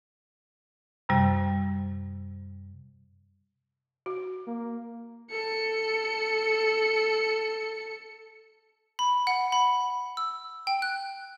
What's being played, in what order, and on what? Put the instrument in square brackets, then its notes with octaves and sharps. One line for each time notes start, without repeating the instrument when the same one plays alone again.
[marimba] F#2 C3 G3
[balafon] F#4
[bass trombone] A#3
[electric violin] A4 C#7
[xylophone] B5
F#5
B5
E6
G5
F#6